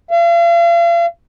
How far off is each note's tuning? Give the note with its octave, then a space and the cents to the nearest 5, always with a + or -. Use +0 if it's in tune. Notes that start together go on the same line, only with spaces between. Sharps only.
F5 -40